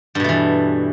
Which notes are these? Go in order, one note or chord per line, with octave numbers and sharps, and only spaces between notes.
G2 B2 E3 A3